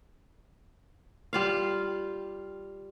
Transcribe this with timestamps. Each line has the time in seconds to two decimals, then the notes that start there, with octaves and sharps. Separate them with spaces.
1.33 G3 F4 F5